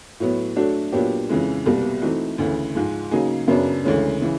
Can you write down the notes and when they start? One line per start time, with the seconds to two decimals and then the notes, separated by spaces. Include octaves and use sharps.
0.20 A2 F#3 B3
0.56 F#3 A3 D4 F#4
0.92 A#2 F#3 B3 D4 G4
1.29 F2 C#3 E3 G#3
1.66 C2 B2 G3 A#3
2.02 E3 A3 C4 D#4 F#4
2.38 D2 C#3 E3
2.75 G#2 F3 G#3
3.11 C#3 F#3 A#3 D#4 G#4
3.48 F#2 C#3 F#3 B3 D4
3.84 D2 C#3 E3 G#3 C#4
4.22 C#3 E3